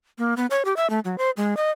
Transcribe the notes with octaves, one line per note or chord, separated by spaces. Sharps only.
A#3
B3
C#5
G4
E5
A3
F#3
C5
G#3
D#5